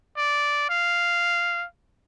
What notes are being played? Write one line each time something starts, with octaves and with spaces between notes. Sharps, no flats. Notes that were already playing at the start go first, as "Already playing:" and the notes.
D5
F5